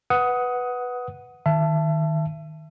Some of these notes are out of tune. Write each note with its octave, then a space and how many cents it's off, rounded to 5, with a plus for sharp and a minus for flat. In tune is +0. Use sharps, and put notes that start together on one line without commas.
B4 +0 F#5 +0 D#6 +15
D#3 +0 E5 +30 A5 +0